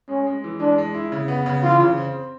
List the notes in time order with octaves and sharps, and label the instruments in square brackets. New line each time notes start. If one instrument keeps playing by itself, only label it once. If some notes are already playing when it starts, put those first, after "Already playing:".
[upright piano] G#3 [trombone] C#4
[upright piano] G#3
E3
[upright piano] G#3 [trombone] D4
[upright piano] G#3
E4
C#3
B3
C#3
[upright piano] E3 [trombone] F4
[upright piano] C#3
C4